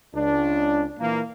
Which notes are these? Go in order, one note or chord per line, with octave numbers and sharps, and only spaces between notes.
C#2 D4
A#2 E3 A#3